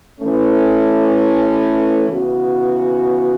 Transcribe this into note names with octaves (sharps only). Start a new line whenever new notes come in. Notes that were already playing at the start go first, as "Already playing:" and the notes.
E3 A3 C#4
C#3 E3 B3 F#4